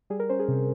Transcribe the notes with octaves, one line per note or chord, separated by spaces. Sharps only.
G3 G#4
A#4
C#4 C5
G#4
C3